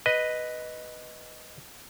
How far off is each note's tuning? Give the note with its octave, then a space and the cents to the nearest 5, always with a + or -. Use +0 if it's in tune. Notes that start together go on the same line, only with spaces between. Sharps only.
B4 +0 D#5 +0